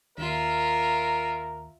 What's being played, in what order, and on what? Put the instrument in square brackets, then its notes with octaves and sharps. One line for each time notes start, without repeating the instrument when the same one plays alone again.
[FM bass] D#2 [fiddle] F4 E5 [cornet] A#4